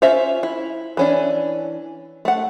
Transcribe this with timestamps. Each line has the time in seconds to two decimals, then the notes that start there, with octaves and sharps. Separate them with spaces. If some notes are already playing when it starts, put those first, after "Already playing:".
0.02 C#4 F4 C5 E5
0.43 E4
0.97 E3 C#4 D4
2.25 A3 F#5